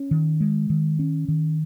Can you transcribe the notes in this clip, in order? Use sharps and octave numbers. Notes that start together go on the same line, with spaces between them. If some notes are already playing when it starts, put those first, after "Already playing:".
Already playing: C#4
D#3
G#3
D#3
C#4
D#3